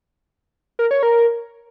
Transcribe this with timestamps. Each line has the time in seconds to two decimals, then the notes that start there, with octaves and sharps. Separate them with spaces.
0.79 A#4
0.91 C#5
1.03 A#4